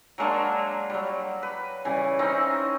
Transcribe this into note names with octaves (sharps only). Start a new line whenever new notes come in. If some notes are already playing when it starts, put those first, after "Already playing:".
F#3 G#3 A#3 D4
F#3 G3
B4
C#3 E3 G3
C4 C#4 D#4 E4